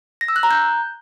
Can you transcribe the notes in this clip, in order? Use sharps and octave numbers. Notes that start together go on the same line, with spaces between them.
A#6
E6
F#6
A#5
G6